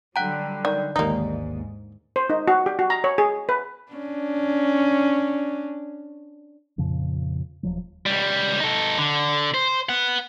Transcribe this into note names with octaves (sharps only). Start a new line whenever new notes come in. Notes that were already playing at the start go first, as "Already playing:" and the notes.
D3 F#3 G3 F#5 G5 A#5 F#6
D#3 D5
A1 D#2 G#2 A#3 D#4
C5
D#4
F#4
G4
F#4
A#5
C#5
G#4
B4
C#4 D4
F2 A#2 C#3 F3
D#1 F3 F#3
C#2 G3
D#4 A4
D3
C5
B4 F#5